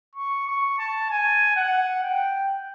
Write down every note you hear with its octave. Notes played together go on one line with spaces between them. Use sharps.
C#6
C#6
A5
G#5
F#5
G5